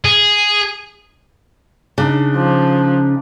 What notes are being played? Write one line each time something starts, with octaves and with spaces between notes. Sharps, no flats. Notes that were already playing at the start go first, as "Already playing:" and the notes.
G#4
C#3 D4 D#4
F3